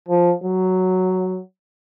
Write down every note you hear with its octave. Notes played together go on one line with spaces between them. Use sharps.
F3
F#3